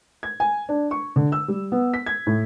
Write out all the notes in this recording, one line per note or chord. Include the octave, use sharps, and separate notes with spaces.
G#6
G#5
D4
C#6
D3
E6
G3
B3
B6
G#6
A2